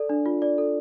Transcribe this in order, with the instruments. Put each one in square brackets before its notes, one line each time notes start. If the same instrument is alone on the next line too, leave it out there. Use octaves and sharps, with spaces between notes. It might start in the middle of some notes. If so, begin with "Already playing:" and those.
Already playing: [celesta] A4 D5
D4
F4
D5
A4